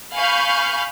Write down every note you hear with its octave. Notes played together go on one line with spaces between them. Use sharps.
F5 G#5 B5 C#6 F6 G6